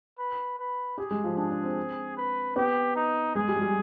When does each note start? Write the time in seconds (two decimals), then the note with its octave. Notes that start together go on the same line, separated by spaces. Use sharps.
0.18 B4
0.59 B4
0.98 G4 G#4
1.11 G#3
1.24 F3
1.37 D4 G#4
1.50 D4
1.64 C4
2.17 B4
2.56 B3 G4
2.96 D#4
3.35 G#3 G#4
3.48 G3
3.56 G#3
3.61 G3